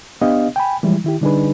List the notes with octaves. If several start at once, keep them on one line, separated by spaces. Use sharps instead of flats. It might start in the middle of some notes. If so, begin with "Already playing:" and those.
B3 D4 G4 D#5 F5
G5 G#5 B5
E3 F3 G3 G#3 E4
D#3 E4 G4
D3 G3 D4 D#4 G#4 B4